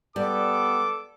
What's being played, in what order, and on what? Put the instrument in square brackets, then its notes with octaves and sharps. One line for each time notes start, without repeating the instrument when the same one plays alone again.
[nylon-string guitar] G3 [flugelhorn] B3 [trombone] A4 [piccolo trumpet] D6